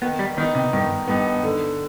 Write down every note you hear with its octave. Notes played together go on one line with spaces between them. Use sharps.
D#3 B3
G3
D#3 B3 D#4
C3
G2 D#3
G2 B3 D#4
D3